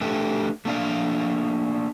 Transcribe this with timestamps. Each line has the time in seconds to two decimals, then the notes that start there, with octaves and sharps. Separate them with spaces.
0.01 A3 D4 G4 A4 B4
0.65 A3 A#3 D4 D5 F5